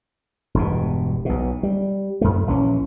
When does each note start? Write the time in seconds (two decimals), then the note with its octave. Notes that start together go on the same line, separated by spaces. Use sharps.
0.54 E1 G2 B2
1.25 B1 B2
1.63 G3
2.21 F#2 A3
2.47 A#1 E3 C#4